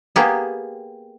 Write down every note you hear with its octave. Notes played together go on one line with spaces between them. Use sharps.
A#3 B3 G4 G#4